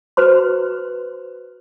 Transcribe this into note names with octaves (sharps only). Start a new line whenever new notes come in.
F#4 B4 C5 C6